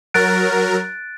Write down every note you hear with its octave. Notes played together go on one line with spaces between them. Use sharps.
F#3 A#4 F#6 A6 D7